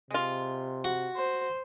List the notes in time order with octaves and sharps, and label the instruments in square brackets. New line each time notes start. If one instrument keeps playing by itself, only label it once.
[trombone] C3 [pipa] G#3 F4
[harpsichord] F#4
[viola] C5